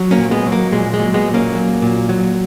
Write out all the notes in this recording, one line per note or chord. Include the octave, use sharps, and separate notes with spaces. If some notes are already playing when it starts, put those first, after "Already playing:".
Already playing: F#3
A#3 C#4
A#2
G#3 B3
F#3
A#3
A#2 G#3
G#3
F#3
G#3 B3
A#2
A#3 C#4
F#3
A#2
F#3